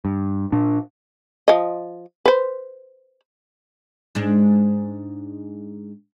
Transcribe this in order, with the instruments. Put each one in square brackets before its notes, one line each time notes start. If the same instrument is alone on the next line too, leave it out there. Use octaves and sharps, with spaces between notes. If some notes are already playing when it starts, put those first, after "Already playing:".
[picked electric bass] G2
A#2 D4
[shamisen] F3 D#5
B4 C5
[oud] G#2 G#3 D4